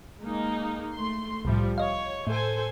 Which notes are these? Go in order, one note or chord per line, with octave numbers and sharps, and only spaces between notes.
G#3 A#3 D#4
A3 C6
C2 A2 F3 G3
C#5 D#5 F5
A2 A4 C5 G#5